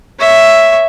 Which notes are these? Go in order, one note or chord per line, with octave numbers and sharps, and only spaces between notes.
C#5 E5